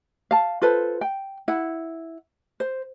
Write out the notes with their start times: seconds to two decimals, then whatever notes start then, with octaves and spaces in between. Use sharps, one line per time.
0.31 F5 A5
0.62 F4 A4 B4 C5
1.01 G5
1.48 E4 F#5
2.60 C5